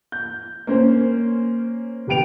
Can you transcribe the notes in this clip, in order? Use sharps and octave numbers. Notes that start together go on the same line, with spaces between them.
G6
A#3 C#4 C5
E1 G4 B4 G5 D7 F7